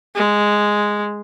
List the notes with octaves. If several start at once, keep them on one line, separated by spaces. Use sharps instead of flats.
G#3